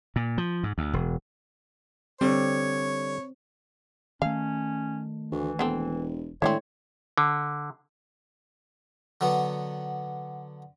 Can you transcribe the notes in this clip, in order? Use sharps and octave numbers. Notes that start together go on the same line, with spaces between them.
A#2
F3
G#2
D2
E1
D3 G3 C4 C#5
D#3 A3 C#4 F5
D2 E3
E1 B3 C4 A4
A2 D#3 G#3 C4 D4 E4 C#5
D3
D3 F#3 B3